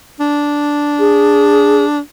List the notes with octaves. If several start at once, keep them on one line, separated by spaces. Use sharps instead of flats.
D4
G#4